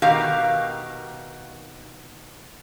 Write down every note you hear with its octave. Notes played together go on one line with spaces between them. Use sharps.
B2 D#3 G4 A#4 F5